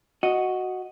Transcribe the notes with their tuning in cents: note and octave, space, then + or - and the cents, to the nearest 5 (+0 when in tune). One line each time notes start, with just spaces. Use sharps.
F#4 +0 D#5 +0